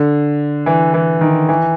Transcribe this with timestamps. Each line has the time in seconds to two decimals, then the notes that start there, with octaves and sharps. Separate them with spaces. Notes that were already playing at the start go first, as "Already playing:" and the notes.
Already playing: D3
0.66 E3
0.94 E3
1.21 D#3
1.49 E3